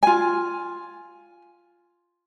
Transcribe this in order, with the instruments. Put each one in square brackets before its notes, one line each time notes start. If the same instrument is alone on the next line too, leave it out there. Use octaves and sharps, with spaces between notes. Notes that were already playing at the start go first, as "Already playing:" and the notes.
[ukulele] F4 G#5